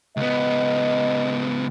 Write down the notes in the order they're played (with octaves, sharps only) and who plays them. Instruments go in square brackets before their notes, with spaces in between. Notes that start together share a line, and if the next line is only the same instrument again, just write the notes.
[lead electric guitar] C#2 B3 [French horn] D#5